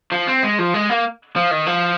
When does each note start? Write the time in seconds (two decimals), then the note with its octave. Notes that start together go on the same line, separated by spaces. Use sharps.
0.12 F3
0.28 C4
0.43 G#3
0.59 F3
0.74 G#3
0.90 A#3
1.36 F3
1.51 D#3
1.67 F3